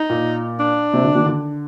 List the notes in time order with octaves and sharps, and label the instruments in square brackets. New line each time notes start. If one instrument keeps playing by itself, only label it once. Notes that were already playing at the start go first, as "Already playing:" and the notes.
Already playing: [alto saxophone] D#4
[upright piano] A#2
[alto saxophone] D4
[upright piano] C3
D3
D#3
D3